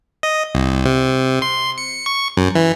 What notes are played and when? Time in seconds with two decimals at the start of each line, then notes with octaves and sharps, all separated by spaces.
0.23 D#5
0.55 C2
0.85 C3
1.42 C6
1.78 C#7
2.06 C#6
2.37 F#2
2.55 E3